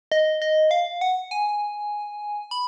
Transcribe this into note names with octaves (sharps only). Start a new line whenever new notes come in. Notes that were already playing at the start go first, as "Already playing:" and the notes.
D#5
D#5
F5
F#5
G#5
B5